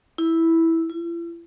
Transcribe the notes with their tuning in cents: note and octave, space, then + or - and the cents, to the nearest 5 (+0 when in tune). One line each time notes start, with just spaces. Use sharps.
E4 -5
E4 +45